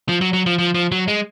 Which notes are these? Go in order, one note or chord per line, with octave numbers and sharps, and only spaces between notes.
F3
F#3
F#3
F3
F3
F3
F#3
G#3